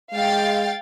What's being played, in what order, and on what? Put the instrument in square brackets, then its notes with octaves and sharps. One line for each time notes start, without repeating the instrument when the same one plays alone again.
[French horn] G#3 [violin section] F5 G5 A6